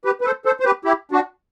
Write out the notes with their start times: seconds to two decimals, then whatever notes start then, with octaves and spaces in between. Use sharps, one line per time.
0.05 G4 B4
0.21 B4
0.25 A4 C5
0.45 A4 C5
0.60 C5
0.65 G4 B4
0.85 E4 G4
1.11 D4 F#4